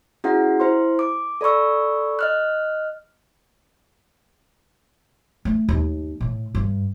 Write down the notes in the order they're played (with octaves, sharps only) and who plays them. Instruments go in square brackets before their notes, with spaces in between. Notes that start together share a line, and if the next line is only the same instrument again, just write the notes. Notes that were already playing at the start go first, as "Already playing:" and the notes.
[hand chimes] C#4 E4 F#4 G#4 F#5
E4 C5 C6
D6
A4 D5 B5 C#6 E6
D#5 F6 F#6
[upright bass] A3
D#2
A2
G2